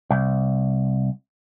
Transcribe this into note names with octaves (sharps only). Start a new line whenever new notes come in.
C2